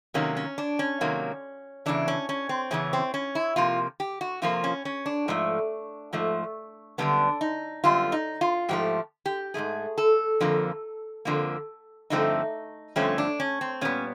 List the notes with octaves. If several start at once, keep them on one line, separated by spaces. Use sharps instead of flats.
C3 D#3 F#3 A#3 C#4
C#4
D4
C#4
C3 D#3 F#3 A#3
E2 C#3 E3 D4
C#4
C#4
C4
E2 C#3 E3 C#4
C4
C#4
E4
C3 F3 A#3 F4
G4
F#4
C3 F3 A#3 F4
C#4
C#4
D4
G#2 F3 A3
G#2 F3 A3
F#2 D3 G3 B3 D4
D#4
F#2 D3 G3 B3 F4
D#4
F4
G#2 F3 A3 G4
G4
G#2 F3 A3 G#4
A4
F2 D3 F3 A#3
F2 D3 F3 A#3
G2 D3 F3 A3 C4 D#4
G2 D3 F3 A3 C4 C#4
D4
C#4
C4
A#2 G3 B3 C#4